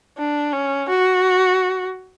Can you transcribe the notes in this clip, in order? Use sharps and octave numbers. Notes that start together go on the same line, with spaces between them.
D4
C#4
F#4